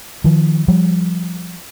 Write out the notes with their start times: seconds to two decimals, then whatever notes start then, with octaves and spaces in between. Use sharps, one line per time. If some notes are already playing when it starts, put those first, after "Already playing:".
0.24 D#3 F3
0.68 F3 G3